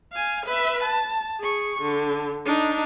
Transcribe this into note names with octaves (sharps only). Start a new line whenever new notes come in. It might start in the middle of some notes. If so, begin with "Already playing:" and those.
F5 G#5
B4 E5
A5
G#4 C#6
D3
D4 D#4